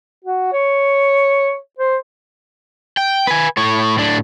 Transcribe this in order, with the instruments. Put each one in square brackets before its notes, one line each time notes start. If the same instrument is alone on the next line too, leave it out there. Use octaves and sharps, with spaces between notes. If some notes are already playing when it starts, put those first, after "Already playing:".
[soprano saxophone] F#4
C#5
C5
[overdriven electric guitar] G5
B4 G#5
A2 C#5
A2 D4